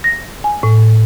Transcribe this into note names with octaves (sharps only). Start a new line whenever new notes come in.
A#6
G#5
A2